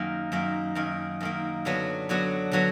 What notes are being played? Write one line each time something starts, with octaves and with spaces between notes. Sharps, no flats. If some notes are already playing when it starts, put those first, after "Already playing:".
Already playing: F#2 D#3 A#3
F#2 D#3 A#3
F#2 D#3 A#3
F#2 D#3 A#3
D3 F#3 B3 D4 F#4
D3 F#3 B3 D4 F#4
D3 F#3 B3 F#4